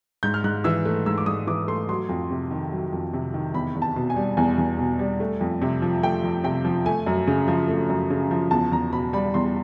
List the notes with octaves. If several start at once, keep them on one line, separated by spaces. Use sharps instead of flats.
G#2 G6
F6
G#2 F#6
E3 E6
A3
G#2 E6
D6
G#2 D#6
E3 D6
A3 C6
F#3 C6
F2
C3
D#3
F#3
F2
C3
D#3
E2 B5
E2
A5
B2
G#5
G3
E2 G#5
E2
B2
G3
A3
F2
C3
F3
A3 G5
F2
C3 G5
F3
A3 G#5
F#2
C#3
F3
A3
F#2
C#3
F3
E2 A5
E2 A#5
B2 B5
G3 B5
E2 C6